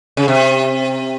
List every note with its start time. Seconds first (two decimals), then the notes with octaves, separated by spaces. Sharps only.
0.17 C#3
0.28 C3